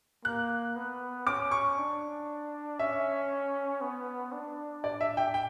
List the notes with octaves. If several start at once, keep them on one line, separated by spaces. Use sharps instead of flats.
A#3 F#6
B3
C#4 D6
C#6
D4
C#4 E5
B3
D4
D5
E5
G5
G5